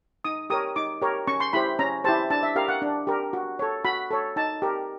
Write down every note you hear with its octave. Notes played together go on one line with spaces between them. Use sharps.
D#4 D#6
G4 A#4 C#5 D#6
D#4 D6
G4 A#4 C#5
C#4 C#6
C6
E4 G4 C5 B5
C#4 A#5
E4 G4 C5 A5
D4 A5
E5
G4 A#4 F5
F#5
D4
G4 A#4
F#4
A4 C#5
F#4 B5
A4 C#5
D#4 A5
G4 A#4